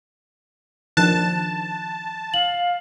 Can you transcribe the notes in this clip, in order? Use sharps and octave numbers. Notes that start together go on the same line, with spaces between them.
D#3 F3 D4 A5 F#6
F5 F#7